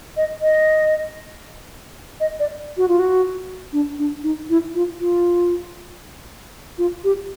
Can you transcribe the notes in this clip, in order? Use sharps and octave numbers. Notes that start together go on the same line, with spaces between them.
D#5
D#5
D#5
D5
F#4
F4
F#4
D4
D4
D#4
E4
F4
F4
F4
G4